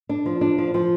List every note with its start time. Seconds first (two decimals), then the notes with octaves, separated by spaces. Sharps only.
0.09 D4
0.26 F3
0.41 D4
0.58 F3
0.74 F3